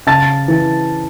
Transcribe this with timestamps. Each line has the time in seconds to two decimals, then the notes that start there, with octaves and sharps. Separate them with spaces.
0.07 C#3 A5 A6
0.48 E3